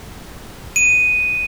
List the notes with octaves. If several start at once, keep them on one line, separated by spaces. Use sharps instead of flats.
D#7